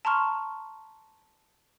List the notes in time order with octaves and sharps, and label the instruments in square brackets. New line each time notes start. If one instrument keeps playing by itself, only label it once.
[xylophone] A5 A#5 C6 C#6 F6